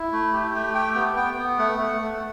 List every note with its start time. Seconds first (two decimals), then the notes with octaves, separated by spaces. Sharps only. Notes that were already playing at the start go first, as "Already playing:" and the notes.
Already playing: E4
0.12 A3
0.33 G4
0.54 A3
0.75 G4 G5
0.95 B3
1.16 B3 G5
1.38 B3
1.58 A3 F#5
1.79 A3
2.01 A3